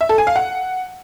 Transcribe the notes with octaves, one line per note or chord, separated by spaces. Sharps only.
E5
A4
G#5
F5
F#5